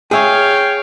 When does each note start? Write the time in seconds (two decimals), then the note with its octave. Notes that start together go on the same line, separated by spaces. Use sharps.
0.11 G#4 C#5 E5 F5 G5